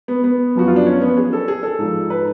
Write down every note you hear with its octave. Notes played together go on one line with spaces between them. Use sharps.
B3
B3
F#2 F3 F#4
F4
D4
C#4
B3
G#4
A4
G#4
A4
G#2 F3
B4